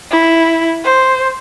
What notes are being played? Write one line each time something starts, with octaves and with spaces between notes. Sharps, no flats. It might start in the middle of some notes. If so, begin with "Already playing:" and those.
E4
C5